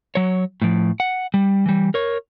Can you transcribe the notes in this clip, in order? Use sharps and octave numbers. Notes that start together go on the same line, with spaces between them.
F#3 C#5
A2 F3
F#5
G3
E3 G3
A#4 C#5